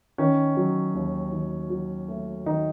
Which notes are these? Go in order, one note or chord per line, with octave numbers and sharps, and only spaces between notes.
D#3 C#4
F#3
D#2
D#3
F#3
A3
D#3 D#4